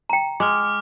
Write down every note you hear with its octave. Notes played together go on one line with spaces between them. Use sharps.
G5 A#5
G#3 D6 F6